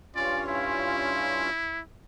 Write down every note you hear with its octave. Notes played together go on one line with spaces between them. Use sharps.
G2 C#4 F4 D5
E4